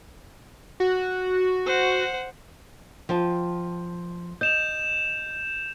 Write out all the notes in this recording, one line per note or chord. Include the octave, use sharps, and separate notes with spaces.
F#4
C5 F#5
F3 G5 A5
D#5 G6 E7 F7